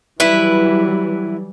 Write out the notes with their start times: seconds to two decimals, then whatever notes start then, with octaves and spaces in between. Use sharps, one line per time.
0.20 E3 F#3 G3 E4 B4